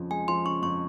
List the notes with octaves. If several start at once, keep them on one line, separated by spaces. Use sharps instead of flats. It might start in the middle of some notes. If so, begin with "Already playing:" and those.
Already playing: F2 C#3 F3
G#3 G#5
F3 C6
C#3 C#6
F2 C#6